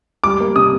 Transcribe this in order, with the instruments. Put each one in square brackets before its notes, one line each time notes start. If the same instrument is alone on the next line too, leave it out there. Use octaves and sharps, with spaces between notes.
[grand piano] G3 D6
A#3
C3 D#6